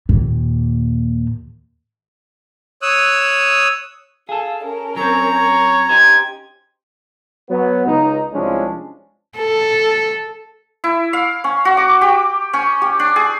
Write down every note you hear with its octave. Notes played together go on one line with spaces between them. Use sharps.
D#2 A#2
C#5 D#6 E6 F#6
G#4 A4 F5
C#4 A#4
F#3 C4 C#5 A#5
C#5
C#4 D#4 G4 C5 G#6
F#3 B3
C#2 D#4
C2 F3 G#3 C#4 D4
A4
E4
F5
C#4
F#4
D6
G4
C#4
G4
D4
G#4